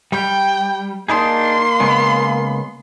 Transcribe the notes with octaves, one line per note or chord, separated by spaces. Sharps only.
G3 G5
A#3 D4 D#4 G#4 C6
C#3 G#3 B3